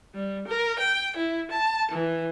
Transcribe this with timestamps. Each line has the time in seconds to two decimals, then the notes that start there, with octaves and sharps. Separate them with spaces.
0.15 G3
0.47 A#4
0.79 G5
1.16 E4
1.51 A5
1.91 E3